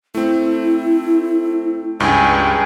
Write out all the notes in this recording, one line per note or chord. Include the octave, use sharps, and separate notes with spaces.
A3 C4 E4
C#2 G2 G#4 G5